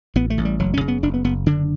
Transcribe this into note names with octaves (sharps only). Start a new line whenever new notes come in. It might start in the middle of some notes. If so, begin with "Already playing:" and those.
A1 B3
A3
A1
G3
F#1 F#3
C#4
C#3
B3
F#1 D4
B3
F#1 B3
D3 D4